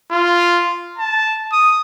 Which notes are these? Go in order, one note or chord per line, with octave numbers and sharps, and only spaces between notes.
F4
A5
D#6